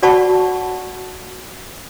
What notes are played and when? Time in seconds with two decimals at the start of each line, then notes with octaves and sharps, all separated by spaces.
0.02 F#4 D5 F#5 A5 B5 C#6